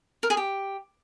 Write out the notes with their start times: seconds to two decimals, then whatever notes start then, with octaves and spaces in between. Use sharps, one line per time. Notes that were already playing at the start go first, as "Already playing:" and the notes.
0.23 A#4
0.30 G#4
0.37 G4